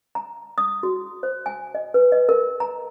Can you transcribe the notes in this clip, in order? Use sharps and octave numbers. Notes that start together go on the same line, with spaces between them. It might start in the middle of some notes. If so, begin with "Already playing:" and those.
A#5
D#6
F#4
C5
G#5
D#5
B4
D#5
A#4
A#5